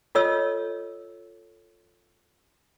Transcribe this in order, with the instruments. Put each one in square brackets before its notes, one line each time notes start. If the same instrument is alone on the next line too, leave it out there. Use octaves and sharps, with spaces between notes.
[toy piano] F4 A4 C#5 D#5 E6